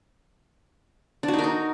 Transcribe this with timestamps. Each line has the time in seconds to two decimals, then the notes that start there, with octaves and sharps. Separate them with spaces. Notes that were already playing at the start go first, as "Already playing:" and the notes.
1.23 D4
1.28 F#4
1.33 D#4
1.39 A#4
1.44 D#4